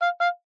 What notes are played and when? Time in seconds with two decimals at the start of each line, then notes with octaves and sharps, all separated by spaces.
0.02 F5
0.21 F5